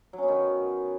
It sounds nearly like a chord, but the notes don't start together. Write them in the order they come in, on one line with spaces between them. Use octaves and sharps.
F#3 C#4 B3 D#3